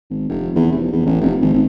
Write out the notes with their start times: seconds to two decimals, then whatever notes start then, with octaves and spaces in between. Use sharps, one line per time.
0.10 G#1
0.29 F1
0.56 E2
0.72 F1
0.92 E2
1.06 A1
1.21 F1
1.42 G#1
1.54 G#1